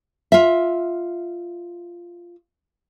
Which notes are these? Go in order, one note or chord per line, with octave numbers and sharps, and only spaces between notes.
F4 E5